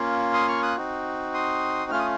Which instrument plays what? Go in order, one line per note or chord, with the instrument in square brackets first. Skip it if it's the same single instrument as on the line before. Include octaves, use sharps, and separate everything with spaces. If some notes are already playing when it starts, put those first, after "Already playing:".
Already playing: [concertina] A#3 C#4 F4
C6 D#6
C#6 F6
D#6 F#6
C4 D#4 F#4
C6 D#6
A3 C#4 F4 F6
D#6